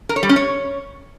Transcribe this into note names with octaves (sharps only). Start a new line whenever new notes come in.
A#4
C#5
G3
C#4
C#5